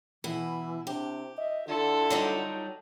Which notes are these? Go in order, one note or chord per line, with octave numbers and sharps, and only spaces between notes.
B2 E3 E4
C3 D4 G4
D#5 E5
D3 E4 F4 A4
F#3 G3 D#4